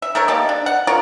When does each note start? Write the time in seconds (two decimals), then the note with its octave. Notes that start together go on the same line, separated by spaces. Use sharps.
0.02 E5
0.15 A3 A4 A#4 C#5
0.28 A#3 D#4 G4 A5
0.49 D4
0.66 F#5
0.87 F4 A#4 C#5